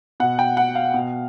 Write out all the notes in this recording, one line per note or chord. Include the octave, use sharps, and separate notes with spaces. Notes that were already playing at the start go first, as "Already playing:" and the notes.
B2 F#5
G5
F#5
F5
B2